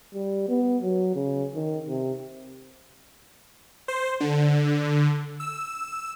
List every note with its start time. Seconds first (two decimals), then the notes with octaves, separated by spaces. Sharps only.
0.14 G3
0.48 B3
0.83 F#3
1.15 C#3
1.55 D#3
1.88 C3
3.88 C5
4.20 D3
5.40 E6